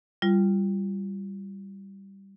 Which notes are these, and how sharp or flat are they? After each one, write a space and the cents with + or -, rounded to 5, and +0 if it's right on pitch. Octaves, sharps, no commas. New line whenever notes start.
G3 +0 F4 -15